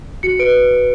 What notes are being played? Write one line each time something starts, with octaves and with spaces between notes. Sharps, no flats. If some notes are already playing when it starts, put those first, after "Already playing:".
F#4 C#7
B4 D7